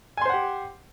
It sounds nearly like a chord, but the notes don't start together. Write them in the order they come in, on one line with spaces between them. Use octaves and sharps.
G#5 C6 C5 F#5 G4